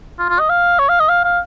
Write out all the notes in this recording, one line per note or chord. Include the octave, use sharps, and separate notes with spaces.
F4
F4
D#5
F5
C#5
F5
D#5
F5
F5